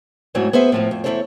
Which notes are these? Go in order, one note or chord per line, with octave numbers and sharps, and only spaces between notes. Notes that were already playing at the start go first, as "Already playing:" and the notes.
G#2 F#3 A3 C4 E4 C#5
B3 G#4 C5 E5
A2 F3 C4
F2
E2 D#3 E4 A4 C5 C#5